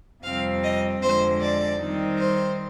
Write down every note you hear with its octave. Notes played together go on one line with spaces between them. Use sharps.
F2 C3 G3 C4 F5
D#5
F2 D3 G#3 C5
D5
D#3 G3 C4 D#4
C5